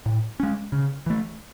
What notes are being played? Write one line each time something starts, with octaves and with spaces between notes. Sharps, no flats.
A2
G#3 C#4
C#3
E3 A3